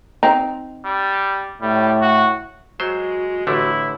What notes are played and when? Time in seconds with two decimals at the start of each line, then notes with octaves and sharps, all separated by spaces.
0.23 C4 D#4
0.85 G3
1.62 A2 G3
2.01 F#4
2.80 F#3 G#3 F#4 C5
3.47 A1 D3 A3 E4